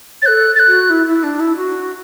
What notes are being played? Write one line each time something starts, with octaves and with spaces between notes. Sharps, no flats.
C#5 A6
A4 F#6
A6
F#6
F#4
E4
E4
D4
E4
F#4